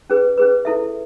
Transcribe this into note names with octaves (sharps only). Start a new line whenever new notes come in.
C#4 G#4 B4
C#4 G#4 B4
E4 A4 E5